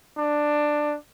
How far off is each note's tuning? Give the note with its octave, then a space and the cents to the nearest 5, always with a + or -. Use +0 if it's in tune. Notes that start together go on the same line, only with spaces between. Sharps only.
D4 +10